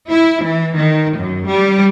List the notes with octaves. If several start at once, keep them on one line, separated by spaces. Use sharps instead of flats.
E4
E3
D#3
F#2
G3